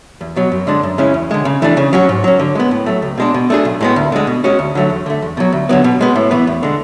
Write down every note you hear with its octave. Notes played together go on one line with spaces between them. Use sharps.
E2
B2 F#3
F#2
D3 G#3 D4
F#2
C#3 G#3 C#4 E4
E2
D3 G#3
C#3
E3 A3 D4
C#3
F#3 C#4 F#4
G#2
F#3 C#4
D3
G#3 B3
A2
F#3 A3
C#2
B2 G#3 D4
B2
A3 D4 G#4
B1
A2 G#3 B3
D2
D3 G#3
B2
G#3 C#4 F#4
D2
D3 F#3 A3
E2
D3 A3
E2
B2 F#3
D2
D3 F#3 B3
B2
G#3 B3
A2
E3 B3
E2
D3 G#3